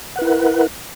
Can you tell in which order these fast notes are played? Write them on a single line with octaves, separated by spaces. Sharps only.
F#5 B4 E4 A#4